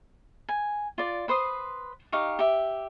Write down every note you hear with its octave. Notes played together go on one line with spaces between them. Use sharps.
G#5
F4 D5
B4 C5 C6 D#6
D#4 G4 F5 C#6
G4 E5